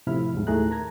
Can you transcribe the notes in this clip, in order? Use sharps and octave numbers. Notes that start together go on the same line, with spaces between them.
A2 C3 F3 E4 B5 F6
D#2 G#2
D#2 A2 A3 G#4 A#5 F#6
A#4 A5 A#5 G#6